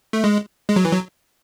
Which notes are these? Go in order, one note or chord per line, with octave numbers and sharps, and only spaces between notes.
A3
G#3
G#3
F#3
E3
F#3